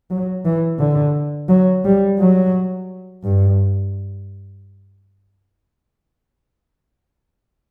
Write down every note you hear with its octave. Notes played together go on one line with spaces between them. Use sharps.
F#3
E3
D3
F#3
G3
F#3
G2